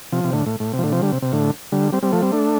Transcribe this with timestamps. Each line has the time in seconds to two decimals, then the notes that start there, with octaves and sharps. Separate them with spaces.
0.12 C3 F3
0.24 C3
0.33 A2 D3
0.46 A2
0.60 A2
0.73 C3
0.78 F3
0.83 A2 D3
0.92 C3 F3
1.02 D3 G3
1.12 C3
1.22 C3
1.33 A2 D3
1.72 D3 G3
1.92 G3 C4
2.02 G3 C4
2.12 F3 A3
2.22 G3 C4
2.32 A3 D4